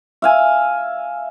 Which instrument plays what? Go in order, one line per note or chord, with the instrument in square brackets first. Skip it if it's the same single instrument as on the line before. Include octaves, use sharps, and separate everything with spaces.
[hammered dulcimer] E5 F5 G#5